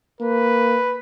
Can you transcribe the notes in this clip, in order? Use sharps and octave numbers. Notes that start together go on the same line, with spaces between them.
A#3 B4